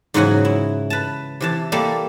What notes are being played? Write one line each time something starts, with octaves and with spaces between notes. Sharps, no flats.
G#2 C#3 E3 F#3 F#4 G#5
E4
B4 A5
C3 E3 A5
G3 A#3 A4 A5